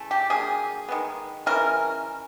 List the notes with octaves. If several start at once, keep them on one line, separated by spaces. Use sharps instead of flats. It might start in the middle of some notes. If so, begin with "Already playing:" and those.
Already playing: C#3 E3 A3
G4
D3 F#3 A#3 D4 G#4
D#3 G#3 B3
C#3 E3 G#3 C#4 A#4